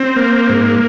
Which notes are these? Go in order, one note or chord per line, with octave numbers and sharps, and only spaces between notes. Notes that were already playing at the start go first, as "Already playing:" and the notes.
Already playing: C4
A#3
G#2